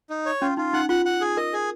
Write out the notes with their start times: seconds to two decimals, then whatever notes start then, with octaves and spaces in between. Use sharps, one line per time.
0.10 D#4
0.26 C#5
0.41 C#4 F4
0.57 D#4 F4
0.73 D#4 F#5
0.89 F4 F#5
1.06 F#5
1.21 G#4
1.37 A#4 D#5
1.53 G#4